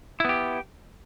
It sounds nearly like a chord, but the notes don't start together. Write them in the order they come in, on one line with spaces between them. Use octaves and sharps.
E4 B3 G4